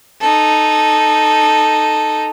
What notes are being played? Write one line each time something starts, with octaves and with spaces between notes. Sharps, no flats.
D#4 A4